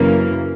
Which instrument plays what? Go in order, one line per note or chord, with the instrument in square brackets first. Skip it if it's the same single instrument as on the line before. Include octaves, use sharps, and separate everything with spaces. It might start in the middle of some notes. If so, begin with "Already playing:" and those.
Already playing: [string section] F#2 C#3 E3 A#3